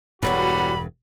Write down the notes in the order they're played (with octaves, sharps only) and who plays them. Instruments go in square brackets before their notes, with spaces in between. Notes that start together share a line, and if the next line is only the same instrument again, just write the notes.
[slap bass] E1 G2 [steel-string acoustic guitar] E3 F#3 B3 [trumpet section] G3 F#4 [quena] B5